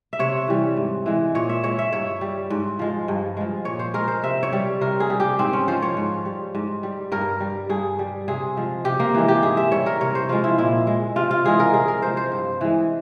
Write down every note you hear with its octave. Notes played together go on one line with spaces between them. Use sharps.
E5
C3 C#5
E3 G3
G#2
E3 G#3
A#2 C#5
E5
G#3 C#5
E5
G2 C#5
G3
G#2
F3 G#3
G2
F3 G#3
A#2 C#5
C5
G#3 A#4
C5
C3 E5
C#5
G3
C3 A#4
G#4
G3
G4
G#2 C4
C#4
F3 G#3 C5
C#5
G#2
G3
G#2
G3
G2 A#4
G3
G2 G#4
G3
C3 G#4
F3 G#3
C3 G4
A#3
E3 G#3
G4
G#2 G#4
E5
G3 C#5
A#4
C3 C#5
C5
F3 G#3 F4
E4
A#2 E4
G#3
C3 F4
F4
E3 G#3 G#4
A#4
C3 G#4
A#4
F3 G#3 C5
C5
G2
E3 G#3